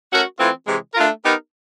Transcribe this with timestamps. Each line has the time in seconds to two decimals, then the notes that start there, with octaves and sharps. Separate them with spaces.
0.11 A3 C#4 F#4 A#4
0.39 E3 A3 C4 F4
0.66 C3 E3 G#3
0.95 A3 D4 F4 A#4
1.23 B3 D#4 G4 A#4